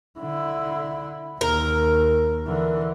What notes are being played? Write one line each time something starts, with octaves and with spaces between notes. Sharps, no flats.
D3 E4
D#2 A#4
D3 E3